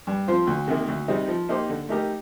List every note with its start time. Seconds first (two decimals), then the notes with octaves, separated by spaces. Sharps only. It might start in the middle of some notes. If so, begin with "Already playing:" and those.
0.07 G2
0.28 F3 C4 F4 C5
0.47 D2
0.68 C3 D#3 A#3
0.88 D2
1.08 C3 G3 C4 D#4
1.28 F3
1.49 A#3 D#4 G4 C5
1.70 D3
1.89 A3 D#4 G4 A#4